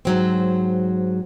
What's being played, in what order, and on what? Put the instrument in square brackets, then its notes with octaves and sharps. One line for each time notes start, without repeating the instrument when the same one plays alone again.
[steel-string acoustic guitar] G#2 F#3 C4